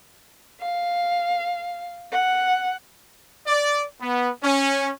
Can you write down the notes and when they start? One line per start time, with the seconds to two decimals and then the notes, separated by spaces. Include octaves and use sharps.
0.60 F5
2.12 F#5
3.47 D5
4.01 B3
4.43 C#4